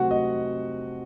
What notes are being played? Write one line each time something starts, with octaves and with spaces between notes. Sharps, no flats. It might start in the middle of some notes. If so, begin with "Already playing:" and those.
Already playing: C3 F#3 A3 C4 F#4 F#5
D#5